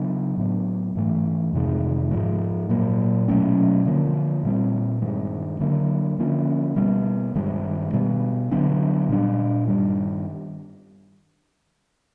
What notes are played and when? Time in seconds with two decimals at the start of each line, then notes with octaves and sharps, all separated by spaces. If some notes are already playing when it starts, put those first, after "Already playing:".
Already playing: C#3 F#3 B3 D4
0.37 A2 F#3 B3
0.96 G#2 E3 A3
1.53 F2 C3 D#3 G#3
2.11 G#2 F3 G#3
2.69 A#2 F#3 A#3
3.28 B2 F#3 A3 C#4
3.85 D3 F3 A#3
4.43 A#2 G3 C4
5.02 G2 D#3 G#3
5.60 D3 F#3 A#3 D4
6.19 D3 F3 A#3 C#4
6.76 B2 G3 B3
7.36 G2 D#3 G#3
7.93 B2 G3 B3
8.51 D3 F#3 B3 D4
9.09 A#2 G3 B3 D4
9.67 G2 D#3 G3